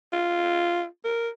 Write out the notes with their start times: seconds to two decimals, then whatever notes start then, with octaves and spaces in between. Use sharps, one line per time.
0.13 F4
1.05 A#4